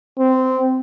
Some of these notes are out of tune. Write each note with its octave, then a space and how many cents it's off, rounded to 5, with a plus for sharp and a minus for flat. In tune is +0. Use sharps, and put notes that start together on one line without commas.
C4 -15